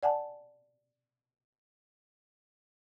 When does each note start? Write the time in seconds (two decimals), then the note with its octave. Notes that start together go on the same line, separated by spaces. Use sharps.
0.03 D5 F#5 G#5 A5